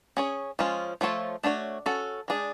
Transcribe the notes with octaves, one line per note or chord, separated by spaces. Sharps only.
C#4 G#4 C#5
F3 G#3 C#4 F4
F3 A3 F4 A4 C#5
A3 D4 F#4 C#5
C#4 F#4 A4
G#3 D4 G#4